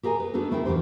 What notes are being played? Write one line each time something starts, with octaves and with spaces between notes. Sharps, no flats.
G4 G#4 A#4 D#5 G#5
B4
B3 D4 D#4 F#4 A4
D2 A3 E4 G#4 A#4 G5
E2 A#2 D4 G4 C5